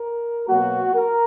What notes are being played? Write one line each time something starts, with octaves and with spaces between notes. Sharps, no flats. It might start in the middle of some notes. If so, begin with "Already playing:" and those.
Already playing: A#4
B2 F#3 A#3 F#4
A#4